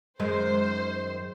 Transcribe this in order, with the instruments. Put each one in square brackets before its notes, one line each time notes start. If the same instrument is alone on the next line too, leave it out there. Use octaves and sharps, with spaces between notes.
[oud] F#2 D#3 G#3 [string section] C5